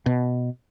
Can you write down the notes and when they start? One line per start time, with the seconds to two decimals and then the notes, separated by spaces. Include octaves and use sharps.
0.06 B2